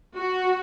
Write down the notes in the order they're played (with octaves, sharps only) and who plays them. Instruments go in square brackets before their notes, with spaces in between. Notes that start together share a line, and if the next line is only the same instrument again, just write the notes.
[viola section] F#4